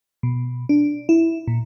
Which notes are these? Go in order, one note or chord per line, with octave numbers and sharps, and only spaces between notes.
B2
D4
E4
A#2